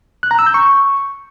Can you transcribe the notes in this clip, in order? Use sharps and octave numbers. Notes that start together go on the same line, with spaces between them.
F#6
A#5
E6
G6
C#6